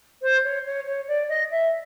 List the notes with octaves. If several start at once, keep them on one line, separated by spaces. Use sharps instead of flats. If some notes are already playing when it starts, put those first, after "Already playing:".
C5
C#5
C#5
C#5
D5
D#5
E5